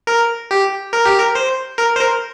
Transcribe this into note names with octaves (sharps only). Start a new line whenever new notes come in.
A#4
G4
A#4
G4
A#4
C5
A#4
C5
A#4